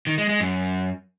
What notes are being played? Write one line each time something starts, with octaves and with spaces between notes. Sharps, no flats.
D#3
G#3
G#3
F#2